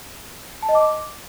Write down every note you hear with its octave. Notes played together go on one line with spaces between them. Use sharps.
A5
D#5
D6